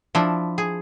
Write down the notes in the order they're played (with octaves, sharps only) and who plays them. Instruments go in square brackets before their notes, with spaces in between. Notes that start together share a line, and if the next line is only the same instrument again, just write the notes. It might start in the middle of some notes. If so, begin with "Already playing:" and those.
[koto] F3 D4 E4
G#4